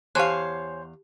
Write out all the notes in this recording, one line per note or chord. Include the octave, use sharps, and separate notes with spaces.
E2 G4 C5 C#5 F5 G#5 A5 F#6